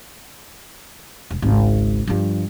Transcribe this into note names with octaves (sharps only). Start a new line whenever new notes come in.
E1
G#1 C#2
G2 F3